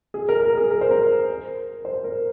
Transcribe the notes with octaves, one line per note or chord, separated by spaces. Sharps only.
G#4
A#4
A#4
G#4
A#4
C5
A#4
C5
A#4